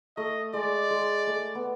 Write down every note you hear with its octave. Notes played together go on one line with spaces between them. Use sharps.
A3 D#5
G#3 D5
G#3
A3
B3